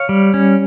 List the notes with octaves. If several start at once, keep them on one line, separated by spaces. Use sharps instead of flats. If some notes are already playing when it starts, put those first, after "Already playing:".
Already playing: C#5 F5
G3
C#4